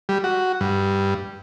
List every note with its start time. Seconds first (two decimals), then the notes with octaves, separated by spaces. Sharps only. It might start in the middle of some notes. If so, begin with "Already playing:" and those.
0.09 G3
0.24 F#4
0.61 G2